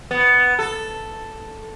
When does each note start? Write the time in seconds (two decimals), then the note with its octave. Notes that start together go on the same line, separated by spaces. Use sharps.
0.11 B3
0.59 A4